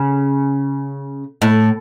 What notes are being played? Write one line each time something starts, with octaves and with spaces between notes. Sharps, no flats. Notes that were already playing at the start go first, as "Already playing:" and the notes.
Already playing: C#3
A2